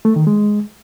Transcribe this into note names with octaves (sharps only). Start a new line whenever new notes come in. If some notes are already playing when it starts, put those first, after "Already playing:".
A3
D#3
G#3